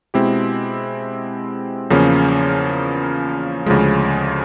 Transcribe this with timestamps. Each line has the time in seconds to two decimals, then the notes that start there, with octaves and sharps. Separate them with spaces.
0.14 B2 G#3 C4 E4 G4
1.90 E2 C#3 F3 A#3 C#4
3.66 D2 C#3 F3 G#3